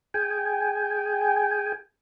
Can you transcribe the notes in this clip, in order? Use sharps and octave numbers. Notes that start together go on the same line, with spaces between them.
G#4 G5 G#5